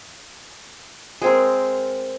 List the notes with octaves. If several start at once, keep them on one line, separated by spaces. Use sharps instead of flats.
G#3 C4 A#4